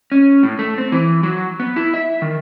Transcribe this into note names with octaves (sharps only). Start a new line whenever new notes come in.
C#4
A2
A3
C4
E3
F#3
B3
E4
E5
D#3